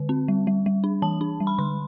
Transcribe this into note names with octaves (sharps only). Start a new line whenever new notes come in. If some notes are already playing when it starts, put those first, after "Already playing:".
Already playing: D3
C4
G3
G3
G3
D4
E3 A5
D4
G3
B5
D3 C6